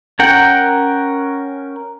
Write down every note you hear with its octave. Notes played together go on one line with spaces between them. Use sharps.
C#4 A#4 F#5 G5